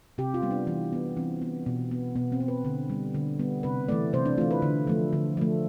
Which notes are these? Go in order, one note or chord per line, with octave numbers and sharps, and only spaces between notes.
C3 G4
F4
G3 B3
D4
E3
B3
E3 C4
B3
B2
B3
B2 B3
C4
B3
B4
D3
G3 B3
D3
G3 B3
C3 B4
E3 A3 D5
C3 C5
D4
E3 A3 F4
B4
D3
F3 A3
D3
F3 A3